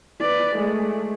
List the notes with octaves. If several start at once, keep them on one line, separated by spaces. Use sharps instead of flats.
B4 D5
G#3 A3